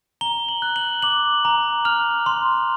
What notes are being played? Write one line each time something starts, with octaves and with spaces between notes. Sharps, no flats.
A#5 G7
F#7
F#6
F#7
D6 F#7
A#5
F6 F7
C6